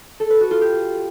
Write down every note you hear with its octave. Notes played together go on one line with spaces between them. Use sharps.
A4
B4
F#4
F4
G4